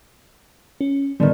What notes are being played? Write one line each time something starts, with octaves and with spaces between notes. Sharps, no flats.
C#4
A2 D3 D#3 G3 B3